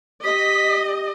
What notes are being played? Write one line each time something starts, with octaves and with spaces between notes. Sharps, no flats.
G4 D#5 B6